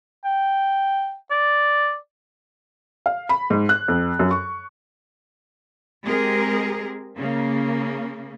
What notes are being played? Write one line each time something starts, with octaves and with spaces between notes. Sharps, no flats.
G5
D5
F5
B5
G#2
F#6
F2
F#2
C#6
G#3 C4 G4 G#4 A#4
C#3 A#3